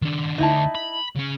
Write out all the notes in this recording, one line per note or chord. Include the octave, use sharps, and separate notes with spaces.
D#3 D4
D2 D3 D#4 E4 A5
B5
C#3 C#4